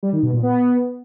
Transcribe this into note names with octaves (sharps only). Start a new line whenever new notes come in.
G3
D#3
B2
A#2
B3